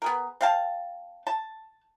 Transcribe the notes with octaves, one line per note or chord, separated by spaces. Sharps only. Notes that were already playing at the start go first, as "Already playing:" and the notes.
B3 G#4 A#4
C4 F5 A5
A5